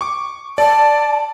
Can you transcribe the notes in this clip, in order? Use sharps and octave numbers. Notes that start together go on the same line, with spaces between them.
C#6 D6
D5 A5